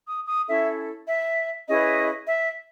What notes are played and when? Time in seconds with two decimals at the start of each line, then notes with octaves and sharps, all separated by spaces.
0.08 D#6
0.28 D#6
0.47 C#4 E4 A4 E5
1.08 E5
1.68 C#4 E4 G#4 B4 D#5
2.27 E5